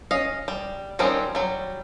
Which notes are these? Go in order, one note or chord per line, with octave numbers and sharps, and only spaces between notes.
C#4 D#5 F5
G3
D#3 F3 G3 C4 C#4
F#3 G3